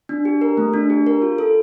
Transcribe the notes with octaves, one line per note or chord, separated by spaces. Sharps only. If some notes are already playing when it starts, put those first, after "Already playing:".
D4
G4
A#4
A3
D4
G4
A#4
F4
A4